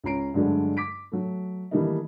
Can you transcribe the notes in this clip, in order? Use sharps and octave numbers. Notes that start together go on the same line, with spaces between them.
C#2 C#3 C#4 A#5 C7 D7
G2 D3 F#3 G#3 A3
D6 B6 D7
F#3 A3
D#3 E3 G3 A3 A#3 D#4